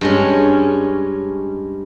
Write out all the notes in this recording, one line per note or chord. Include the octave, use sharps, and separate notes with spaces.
G2 G#3 C#4